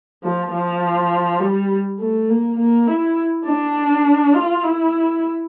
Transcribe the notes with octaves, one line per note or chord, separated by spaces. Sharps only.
F3
F3
G3
A3
A#3
A#3
E4
D4
F4
E4